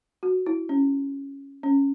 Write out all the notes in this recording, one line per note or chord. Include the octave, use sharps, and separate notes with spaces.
F#4
E4
C#4
C#4